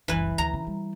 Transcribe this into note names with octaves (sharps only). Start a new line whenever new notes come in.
F#1 C2 E3 B4
D2 A#5
C#3
G3